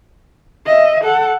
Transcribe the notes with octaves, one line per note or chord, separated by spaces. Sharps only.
D#5 E5
A4 F#5